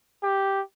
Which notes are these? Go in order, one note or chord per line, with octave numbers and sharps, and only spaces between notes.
G4